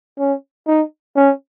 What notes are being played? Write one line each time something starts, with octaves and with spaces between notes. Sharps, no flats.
C#4
D#4
C#4